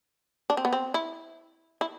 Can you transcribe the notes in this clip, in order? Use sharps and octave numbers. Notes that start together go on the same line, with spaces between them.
D4
C4
B3
C4
E4
E4